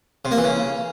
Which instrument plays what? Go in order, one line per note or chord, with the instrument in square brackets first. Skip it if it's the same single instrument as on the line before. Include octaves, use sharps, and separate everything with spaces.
[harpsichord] C3
A#3
E3
C#3